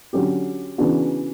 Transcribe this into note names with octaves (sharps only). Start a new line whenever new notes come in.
D3 F#3 C#4 G4
C#3 E3 B3 D4 F#4